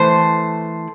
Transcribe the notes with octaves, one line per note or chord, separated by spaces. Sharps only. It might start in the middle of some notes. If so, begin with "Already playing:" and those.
Already playing: E3 A3 C5